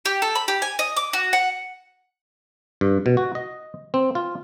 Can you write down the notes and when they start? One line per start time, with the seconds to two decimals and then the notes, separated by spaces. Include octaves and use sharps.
0.06 G4
0.22 A4
0.35 B5
0.48 G4
0.62 G#5
0.79 D#5
0.97 D6
1.13 F#4
1.33 F#5
2.81 G2
3.06 B2
3.17 F#4
3.35 D#5
3.94 C4
4.15 F4